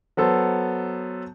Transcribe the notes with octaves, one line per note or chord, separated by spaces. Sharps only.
F#3 B3 A4 C5